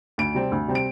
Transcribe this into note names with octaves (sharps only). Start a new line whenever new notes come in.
D2 D7
C3 G3 C4
D2
C3 G3 C4
D7